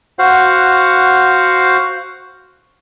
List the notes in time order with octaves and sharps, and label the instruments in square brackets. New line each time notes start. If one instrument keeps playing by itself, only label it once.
[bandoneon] F#4 C5 F5 F#5